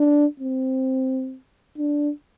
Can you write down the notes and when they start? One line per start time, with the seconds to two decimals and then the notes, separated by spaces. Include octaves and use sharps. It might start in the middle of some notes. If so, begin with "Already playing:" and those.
Already playing: D4
0.40 C4
1.78 D4